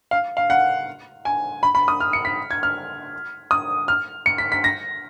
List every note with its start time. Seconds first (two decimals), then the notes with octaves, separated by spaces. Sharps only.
0.11 F5
0.37 F5
0.50 F#5
1.25 G#5
1.63 B5
1.75 B5
1.88 D#6
2.00 F6
2.13 C#7
2.25 B6
2.51 G#6
2.63 F6
3.51 D#6
3.88 F6
4.26 C#7
4.38 B6
4.52 B6
4.64 A#6